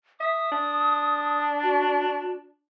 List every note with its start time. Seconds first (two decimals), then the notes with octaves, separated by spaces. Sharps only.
0.20 E5 D#6
0.52 D4
1.63 F#4